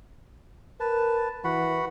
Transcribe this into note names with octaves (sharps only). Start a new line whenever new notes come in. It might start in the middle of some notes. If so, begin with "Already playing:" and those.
A#4 B4 A5
E3 F#4 F#5 B5